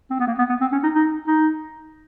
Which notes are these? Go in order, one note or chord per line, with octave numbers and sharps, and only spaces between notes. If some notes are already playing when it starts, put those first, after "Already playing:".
C4
B3
A#3
B3
B3
C4
C#4
D#4
D#4
D#4